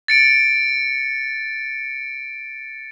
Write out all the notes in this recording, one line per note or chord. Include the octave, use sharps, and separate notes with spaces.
A6 C#7 D7